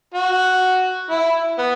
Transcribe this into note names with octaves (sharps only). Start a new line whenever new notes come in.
F#4
E4
B3